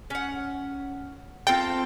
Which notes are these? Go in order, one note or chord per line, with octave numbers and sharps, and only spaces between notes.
C#4 F#5
C4 F4 A4 G5